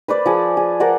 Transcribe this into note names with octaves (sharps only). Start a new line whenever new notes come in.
B4 C5 D5
F3 G#4
G#4
A#4 C5 D5 F#5